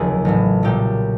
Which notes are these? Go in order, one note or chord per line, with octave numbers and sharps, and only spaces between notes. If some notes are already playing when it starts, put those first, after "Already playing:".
Already playing: F1 D#2 C#3 F#3 G#4
A1 A2 E3
B1 A#2 G3 G4